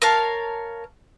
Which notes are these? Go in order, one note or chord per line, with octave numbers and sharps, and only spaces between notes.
A#4 C#5 F5 A5